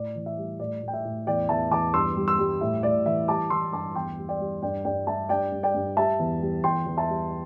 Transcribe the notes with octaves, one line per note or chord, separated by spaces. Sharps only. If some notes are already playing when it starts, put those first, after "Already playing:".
Already playing: A2 D5
E3
E5
G3
A2 D5
A2
G5
E5
A2
E2 D5 G5
E2 E5 A5
E2 A5 D6
G2 C6 E6
G3
C6 E6
G3
A2 E5
A2 D5
E3 E5
G3 A5 D6
E3 C6 E6
G2 A5 D6
E2 G5 C6
G3
D5 G5
G3
G2 D5 G5
G2 D5 G5
G2 E5 A5
G2 D5 G5
G2
D5 G5
G2
G3 E5 A5
E2
G3
E2 G5 C6
E2
E5 A5
G3